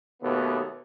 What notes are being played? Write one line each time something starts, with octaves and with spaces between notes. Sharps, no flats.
D#2 B2 A3 B3